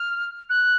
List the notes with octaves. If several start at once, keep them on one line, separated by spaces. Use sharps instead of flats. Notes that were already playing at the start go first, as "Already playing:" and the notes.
Already playing: F6
F#6